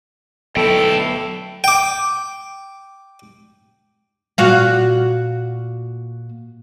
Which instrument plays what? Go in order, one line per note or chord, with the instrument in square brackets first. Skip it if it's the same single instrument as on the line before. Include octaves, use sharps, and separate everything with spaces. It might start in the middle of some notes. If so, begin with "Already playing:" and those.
[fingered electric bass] D2 F#3 B3 [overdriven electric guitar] E4 G5 [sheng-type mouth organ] A4
[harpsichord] G5 D6
[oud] A#2 F#4 F5